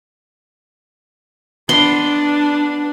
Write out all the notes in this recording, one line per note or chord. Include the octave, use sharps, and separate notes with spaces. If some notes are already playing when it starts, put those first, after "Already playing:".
B3 D4 C6